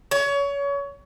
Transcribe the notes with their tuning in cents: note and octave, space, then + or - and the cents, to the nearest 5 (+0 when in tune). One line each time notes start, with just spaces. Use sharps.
C#5 +25